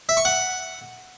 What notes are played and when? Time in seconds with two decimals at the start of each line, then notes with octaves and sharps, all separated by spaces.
0.09 E5
0.17 C#6
0.25 F#5